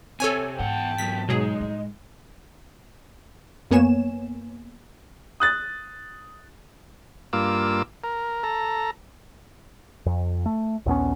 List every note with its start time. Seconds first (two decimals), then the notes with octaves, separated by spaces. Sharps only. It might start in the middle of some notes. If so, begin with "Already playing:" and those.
0.20 C3 A4 C#5 G#5
0.59 E2 G#2 F#5 G5 A5
0.98 E2 F#3 B6
1.29 B2 F#3 G#3 D#4 G#4
1.60 A2 G3
3.71 F#2 A#3 B3 C#5 G#5 E7
5.40 D#6 F#6 A6
7.33 G2 A#3 F4 D6 E6
8.04 A#4
8.43 A4 A#5
10.06 F2
10.46 A3
10.86 A#1 D#2 B3 C#4